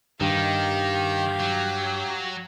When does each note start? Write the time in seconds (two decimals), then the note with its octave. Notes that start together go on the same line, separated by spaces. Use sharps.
0.21 G2 D#3 G4 F5
1.39 F#3